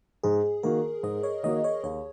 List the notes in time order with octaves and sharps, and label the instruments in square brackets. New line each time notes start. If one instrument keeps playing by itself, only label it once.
[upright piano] G#2 [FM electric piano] G#4
[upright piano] D#3 A#3 F#4 [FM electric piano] A#4
[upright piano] G#2 [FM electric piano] D#5
[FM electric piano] C#5
[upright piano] D#3 A#3 F#4 [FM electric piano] D#5
[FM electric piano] C#5
[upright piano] D#2 [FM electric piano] C#5